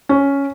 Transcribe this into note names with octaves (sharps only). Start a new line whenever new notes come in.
C#4